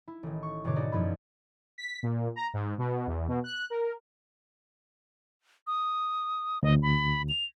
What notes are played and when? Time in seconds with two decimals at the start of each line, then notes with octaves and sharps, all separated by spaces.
0.08 E4
0.23 A1 D#3
0.43 C#6
0.64 E1 G#2 B2 D3 C#5 D6
0.76 D#4 F#4 G#4 D5
0.92 F#2 F3 B3 E4 B5 G#6
1.78 B6
2.03 A#2
2.36 A#5
2.54 G#2
2.78 B2
3.07 E2
3.28 B2
3.44 F#6
3.70 A#4
5.67 D#6
6.63 D2 D#5
6.82 B5
7.29 F7